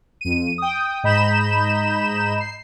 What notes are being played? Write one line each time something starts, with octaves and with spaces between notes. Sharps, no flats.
F2 D#7
G5 D#6
G#2 D#5 A#5 B5 G6 E7
C7